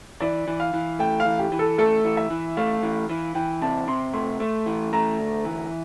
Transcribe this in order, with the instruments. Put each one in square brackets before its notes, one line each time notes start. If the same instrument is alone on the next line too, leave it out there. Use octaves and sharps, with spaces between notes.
[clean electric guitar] E3 [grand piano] D5
[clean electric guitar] E3
[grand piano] F5
[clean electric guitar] E3
[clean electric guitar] A3 [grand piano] G5
[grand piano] F5
[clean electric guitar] E3
[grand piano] G4
[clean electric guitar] E3
[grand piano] A4
[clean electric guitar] A3 [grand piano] A4
[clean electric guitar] E3
[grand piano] E5
[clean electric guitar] E3
[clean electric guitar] A3 [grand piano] F5
[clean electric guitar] E3
E3
[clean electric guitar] E3 [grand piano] G5
[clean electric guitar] C3 [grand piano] A5
[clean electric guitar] C3 [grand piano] C6
[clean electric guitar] A3 [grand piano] C6
[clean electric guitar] A3
E3
[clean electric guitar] A3 [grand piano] A#5
[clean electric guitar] D2
E3